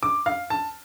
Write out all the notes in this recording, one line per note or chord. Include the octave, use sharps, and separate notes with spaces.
D6
F5
A5